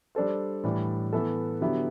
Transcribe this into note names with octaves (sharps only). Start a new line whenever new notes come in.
G3 D4 A4 C5
A2 E3 G3 D4
E3 B3 E4 A4 E5
D3 F#3 B3 E4 G4